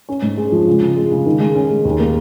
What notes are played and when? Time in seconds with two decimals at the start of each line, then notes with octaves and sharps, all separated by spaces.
0.09 C#4
0.22 G#2
0.37 G#3
0.52 F3
0.68 C#3
0.81 C#3
0.96 G#3
1.12 C#3
1.25 D#3
1.40 G#3
1.55 C#4
1.70 G#3
1.85 D#2
2.00 A#3